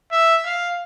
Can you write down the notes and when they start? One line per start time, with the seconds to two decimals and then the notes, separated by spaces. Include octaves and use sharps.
0.11 E5
0.45 F5